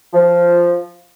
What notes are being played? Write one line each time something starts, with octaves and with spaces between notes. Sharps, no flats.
F3